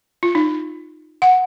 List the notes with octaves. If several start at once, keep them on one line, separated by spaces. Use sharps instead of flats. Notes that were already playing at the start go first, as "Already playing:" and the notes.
F4
D#4
F#5